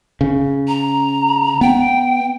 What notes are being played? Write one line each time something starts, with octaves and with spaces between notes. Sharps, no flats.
C#3
A#5
B3 G5